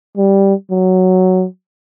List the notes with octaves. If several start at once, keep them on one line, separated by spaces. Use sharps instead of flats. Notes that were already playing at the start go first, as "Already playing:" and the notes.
G3
F#3